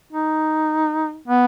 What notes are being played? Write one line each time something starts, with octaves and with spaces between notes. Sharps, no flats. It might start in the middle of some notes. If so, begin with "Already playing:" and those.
D#4
B3